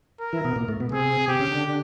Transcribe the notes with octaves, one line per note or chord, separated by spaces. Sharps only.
A#4
E3 E4
B2 B3
A#2 A#3
A2 A3
B2 B3
C3 C4 G#4
C3 C4 G4
C#3 C#4
D3 D4